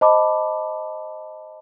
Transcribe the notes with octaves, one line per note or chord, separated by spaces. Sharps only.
C5 D#5 A5 B5 D6